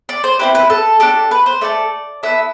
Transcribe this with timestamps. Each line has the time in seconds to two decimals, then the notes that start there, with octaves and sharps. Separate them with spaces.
0.09 D5
0.24 C5
0.39 C4 E4 G4 B4
0.55 B4
0.70 A4
1.00 D4 G4 A4
1.31 B4
1.46 C5
1.61 A3 D4 A4 D5
2.23 B3 E4 A4 E5